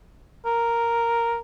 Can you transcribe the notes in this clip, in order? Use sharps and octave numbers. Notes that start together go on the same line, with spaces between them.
A#4